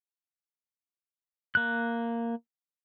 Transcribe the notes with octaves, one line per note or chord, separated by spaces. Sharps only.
A#3 F#6